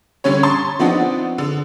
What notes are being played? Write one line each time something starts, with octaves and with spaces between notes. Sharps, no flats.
D3 G3 C#4 C#5
A5 C6 C#6 A6
F3 B3 C4 D4 D#4 F#5
D3